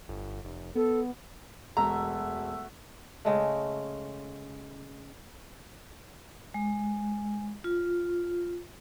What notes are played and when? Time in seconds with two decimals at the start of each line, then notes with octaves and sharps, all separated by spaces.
0.09 G1
0.44 F1
0.75 B3 A4
1.77 E1 A3 F#4 E5 A#5
3.25 C#3 G#3 A3
6.54 G#3
7.64 F4